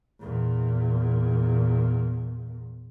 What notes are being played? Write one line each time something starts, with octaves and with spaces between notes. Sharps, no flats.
E2 A#2